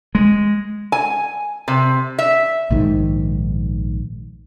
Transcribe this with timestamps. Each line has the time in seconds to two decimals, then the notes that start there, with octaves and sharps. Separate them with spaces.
0.15 G#3
0.92 G#5
1.68 C3
2.19 E5
2.70 A#1 G#2 D#3